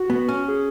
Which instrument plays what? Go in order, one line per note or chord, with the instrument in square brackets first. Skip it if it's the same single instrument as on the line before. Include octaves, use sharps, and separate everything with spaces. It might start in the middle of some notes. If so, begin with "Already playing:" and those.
Already playing: [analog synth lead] F#4
[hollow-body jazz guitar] B3
C#4
[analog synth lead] G#4